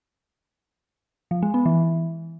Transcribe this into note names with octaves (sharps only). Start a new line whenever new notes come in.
F3
G#3
B3
E3